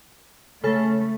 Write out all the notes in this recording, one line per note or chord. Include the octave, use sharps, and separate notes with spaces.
C#3 A3 A4